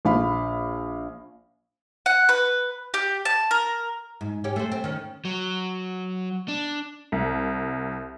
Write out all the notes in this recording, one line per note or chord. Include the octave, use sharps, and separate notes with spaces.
A#1 F5 B5
F#5
B4
G4
A5
A#4
G#2
C#4 G4
A3 C5
C4
D#3 C#4
F#3
D4
C2